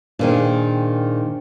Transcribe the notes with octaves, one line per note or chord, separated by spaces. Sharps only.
A#2 D#3 D4 G#4 C5 G5